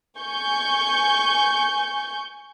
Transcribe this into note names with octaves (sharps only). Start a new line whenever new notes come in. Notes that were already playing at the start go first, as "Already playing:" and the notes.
G#5 C#6 G6